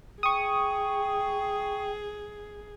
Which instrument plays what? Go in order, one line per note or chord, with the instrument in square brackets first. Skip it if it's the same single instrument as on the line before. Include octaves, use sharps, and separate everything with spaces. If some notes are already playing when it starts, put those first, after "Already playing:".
[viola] G#4 [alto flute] G5 [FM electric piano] C#6 D#6